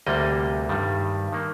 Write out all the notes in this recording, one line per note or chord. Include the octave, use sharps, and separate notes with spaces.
D2 C3 G3 A#3 D#5
G2 D#3 G3
D#3 A#3